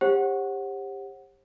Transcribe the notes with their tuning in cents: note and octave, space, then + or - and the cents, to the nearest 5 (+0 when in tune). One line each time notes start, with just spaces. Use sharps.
G4 +25 C5 +45 F#5 +0